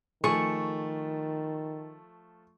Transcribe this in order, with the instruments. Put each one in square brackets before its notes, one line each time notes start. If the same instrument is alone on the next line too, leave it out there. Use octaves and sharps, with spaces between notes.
[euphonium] D#3 [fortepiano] F3 A3 [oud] G#4 [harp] C#6